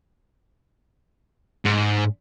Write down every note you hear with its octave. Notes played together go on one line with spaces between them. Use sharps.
G#2